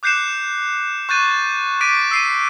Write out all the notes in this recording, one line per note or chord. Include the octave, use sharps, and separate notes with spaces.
D6 F#6 G6 C7 C#7 E7
C#6 F#6 G6 A6 D#7
C#6 D6 A6 B6 D7 D#7
E6 C7 D#7